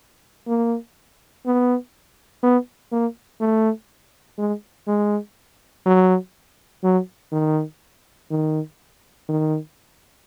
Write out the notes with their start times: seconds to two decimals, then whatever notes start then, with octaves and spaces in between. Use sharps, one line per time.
0.47 A#3
1.46 B3
2.43 B3
2.92 A#3
3.41 A3
4.39 G#3
4.88 G#3
5.86 F#3
6.84 F#3
7.32 D#3
8.31 D#3
9.29 D#3